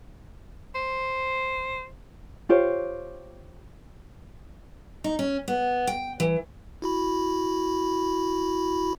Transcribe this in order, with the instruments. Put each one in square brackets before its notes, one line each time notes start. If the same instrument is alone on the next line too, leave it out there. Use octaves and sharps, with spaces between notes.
[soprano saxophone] C5
[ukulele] F4 G4 C5 C#5
[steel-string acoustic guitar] D#4
C#4
B3
G5
E3
[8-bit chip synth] E4 F#4 B5